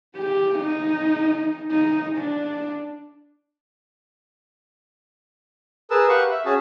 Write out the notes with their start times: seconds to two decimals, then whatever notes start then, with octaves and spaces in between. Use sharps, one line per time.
0.18 G4
0.59 D#4
1.71 D#4
2.18 D4
5.90 G#4 A#4 B4 A5 E6
6.09 G4 B4 F5 F#5 C#6
6.31 E5
6.45 C#4 F#4 G#4 A5